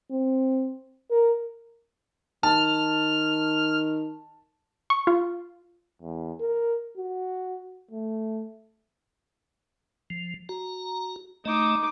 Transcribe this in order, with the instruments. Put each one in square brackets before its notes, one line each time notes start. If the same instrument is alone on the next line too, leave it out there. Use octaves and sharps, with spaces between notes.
[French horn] C4
A#4
[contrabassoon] D#3 [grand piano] A5 [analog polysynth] F6
[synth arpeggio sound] C#6
F4
[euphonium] E2
A#4
F#4
A3
[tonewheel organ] F3
F#4 A#5
[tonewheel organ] A3 D#5 [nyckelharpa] D#4 D6